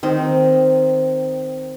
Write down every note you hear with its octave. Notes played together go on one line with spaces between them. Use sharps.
D#3 C4